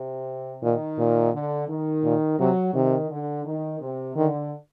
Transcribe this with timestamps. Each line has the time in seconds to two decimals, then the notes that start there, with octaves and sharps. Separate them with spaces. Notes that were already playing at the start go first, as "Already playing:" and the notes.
Already playing: C3
0.63 A#2 D#3
0.99 A#2
1.33 D3
1.69 D#3
2.04 A#2
2.39 C3 F#3
2.74 C3 D#3
3.10 D3
3.45 D#3
3.81 C3
4.16 D3 D#3